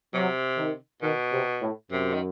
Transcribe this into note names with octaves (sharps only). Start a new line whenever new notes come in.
C3 F#3
D#3
B2 D#3
C3
A2
F#2 C3
D#3